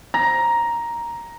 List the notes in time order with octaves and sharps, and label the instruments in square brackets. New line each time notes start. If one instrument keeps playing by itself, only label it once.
[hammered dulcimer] A#5